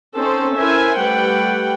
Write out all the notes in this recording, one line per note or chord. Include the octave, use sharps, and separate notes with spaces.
C4 C#4 D#4 A4 C5
C#4 E4 A#4 C5 E5 G#5
G3 A3 B4 F#5 G5